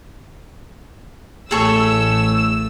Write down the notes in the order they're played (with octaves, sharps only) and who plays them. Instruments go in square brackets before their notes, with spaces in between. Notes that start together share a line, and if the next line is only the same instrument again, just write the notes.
[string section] A1 A3 E6 [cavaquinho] G#4 A4 C#5